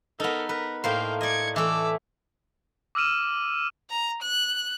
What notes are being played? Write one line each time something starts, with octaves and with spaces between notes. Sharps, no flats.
B3 D#4 A4 A#4
A#4 B4
A2 A#3 C5 F5 G5
D5 D#5 G#6 C#7
E3 A3 D6 E6
D6 E6 F6 D#7 E7
A#5
F#6